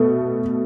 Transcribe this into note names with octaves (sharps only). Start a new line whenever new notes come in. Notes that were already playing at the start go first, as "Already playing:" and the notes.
Already playing: B2 A3